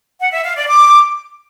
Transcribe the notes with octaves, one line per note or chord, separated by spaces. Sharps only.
F#5
E5
F5
D5
D6